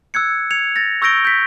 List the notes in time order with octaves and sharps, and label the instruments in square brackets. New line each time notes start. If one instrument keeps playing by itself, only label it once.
[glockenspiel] E6 F#6 G#6 C#7
G#6 C#7 F7
A6 A#6
C#6 E6 G6 A#6 D7 G7
G6 B6